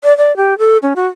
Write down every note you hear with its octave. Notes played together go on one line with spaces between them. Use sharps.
D5
D5
G4
A4
C#4
F#4